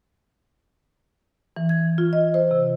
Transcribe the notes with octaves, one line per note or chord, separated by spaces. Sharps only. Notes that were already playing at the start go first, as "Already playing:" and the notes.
E3
G#6
F4
D#5
C5
C3